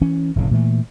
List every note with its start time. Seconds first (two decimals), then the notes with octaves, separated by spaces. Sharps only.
0.01 E3 C#4
0.36 F1 A2 C#3
0.51 A#2 E3 A3